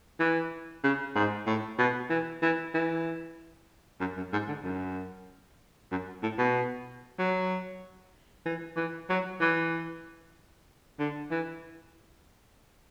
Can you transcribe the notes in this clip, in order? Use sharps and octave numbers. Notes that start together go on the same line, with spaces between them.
E3
C#3
G#2
A2
B2
E3
E3
E3
F#2
F#2
G#2
D3
F#2
F#2
A2
B2
F#3
E3
E3
F#3
E3
D3
E3